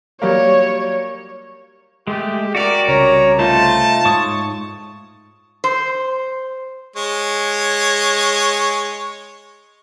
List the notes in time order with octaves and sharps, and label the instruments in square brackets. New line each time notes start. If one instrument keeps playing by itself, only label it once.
[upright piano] F#3 G3 A#3 [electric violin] C#5
[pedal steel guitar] G#3 A3 [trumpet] G4
[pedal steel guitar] F#4 G4 A#4 [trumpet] D5
[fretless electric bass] C2 C#3 [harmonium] C#5 [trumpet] A#5
[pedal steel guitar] A3 D#4 C5 [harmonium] F4 [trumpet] A5
[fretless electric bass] G#2 [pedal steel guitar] C#5 C#6 D#6
[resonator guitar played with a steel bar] C5
[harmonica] G#3 C#5